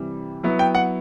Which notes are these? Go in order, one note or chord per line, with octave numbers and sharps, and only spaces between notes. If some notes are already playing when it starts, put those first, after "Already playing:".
Already playing: C3 E3 G3
F#3 B3 E4
G5
F#5